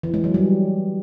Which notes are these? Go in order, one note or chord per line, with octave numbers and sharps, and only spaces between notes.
E3
G#3
F#3
G3